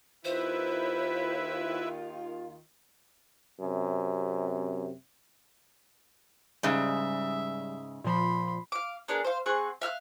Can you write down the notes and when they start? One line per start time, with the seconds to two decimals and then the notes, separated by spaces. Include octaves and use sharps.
0.25 D#2 D#3 E4 F4 B4 C5 E5
3.60 F#2 C3
6.63 G#2 C#3 G3 E5
8.04 A#2 F3 B5 C6
8.72 F5 D6
9.08 B3 D4 G#4 A#4
9.24 C5 F5
9.46 C4 G#4 F#5 C#6
9.82 E5 F5 E6 F#6